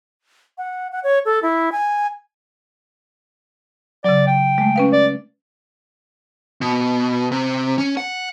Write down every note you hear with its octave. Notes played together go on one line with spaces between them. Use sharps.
F#5
F#5
C#5
A4
E4
G#5
C#3 F#3 D5
G5
G#3 A3
C#4 B4 F5
D5
B2
C3
C#4
F#5